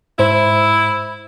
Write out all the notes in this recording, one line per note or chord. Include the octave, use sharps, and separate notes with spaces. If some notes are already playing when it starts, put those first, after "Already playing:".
G#2 E4 C5